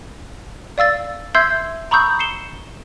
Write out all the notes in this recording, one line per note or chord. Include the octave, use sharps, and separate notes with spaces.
D5 F5 E6 A6
E5 C6 E6 G6 G#6 C7
A#5 B5 C#6 D#6 E6 G6
C7 C#7 E7 G7